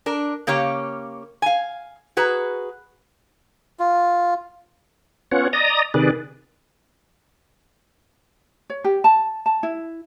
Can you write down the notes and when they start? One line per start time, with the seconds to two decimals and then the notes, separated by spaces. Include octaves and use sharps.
0.06 D4 A#4
0.47 C#3 A#3 C#4 G4 C#5
1.42 F5 G#5
2.17 F#4 G#4 B4 A#5
3.79 F4
5.31 B3 C#4 F4 C#5 F#5
5.53 D5 D#5 A#5 D#6
5.94 C3 D#3 G#4 B4 D5
8.70 C#5
8.84 G4
9.04 A5
9.46 A5
9.63 E4